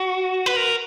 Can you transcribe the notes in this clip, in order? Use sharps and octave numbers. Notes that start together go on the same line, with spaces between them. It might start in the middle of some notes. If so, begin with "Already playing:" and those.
Already playing: F#4
B4
A#4